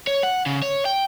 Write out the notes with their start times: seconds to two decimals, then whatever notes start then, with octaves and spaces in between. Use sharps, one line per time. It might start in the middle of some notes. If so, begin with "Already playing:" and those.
0.07 C#5
0.23 F#5
0.46 C#3
0.62 C#5
0.86 G5